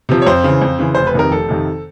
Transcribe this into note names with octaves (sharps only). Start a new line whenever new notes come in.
C3 F3
C#5
F2 C5
C#3 E3
F2
C#3 E3
F1 C5
B4
F2 C3 D#3 A#4
F1 A4
F2 C3 D#3